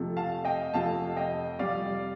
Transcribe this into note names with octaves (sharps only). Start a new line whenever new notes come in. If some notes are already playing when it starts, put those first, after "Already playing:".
Already playing: F2 C3 F3 A3
F5 A5
D#5 G5
F2 C3 F3 A3 F5 A5
D#5 G5
F2 C3 G3 D5 F5